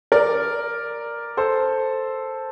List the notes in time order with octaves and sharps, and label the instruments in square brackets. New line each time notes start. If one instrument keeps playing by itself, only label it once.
[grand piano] A#4 D5
A4 C5